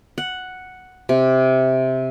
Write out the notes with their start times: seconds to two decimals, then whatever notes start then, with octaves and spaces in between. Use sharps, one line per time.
0.18 F#5
1.09 C3